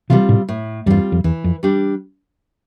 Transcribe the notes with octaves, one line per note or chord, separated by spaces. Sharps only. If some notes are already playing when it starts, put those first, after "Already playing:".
C3 E3 G3 C4 F4
A2 C3
A2
E2 G2 G3 C4 F4
F2
E2 E3
F2
G3 D4 G4